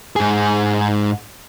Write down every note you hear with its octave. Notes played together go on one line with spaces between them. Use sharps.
G#2 G#4